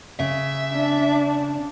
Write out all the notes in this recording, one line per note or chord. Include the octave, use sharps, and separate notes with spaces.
C#3 E5
D4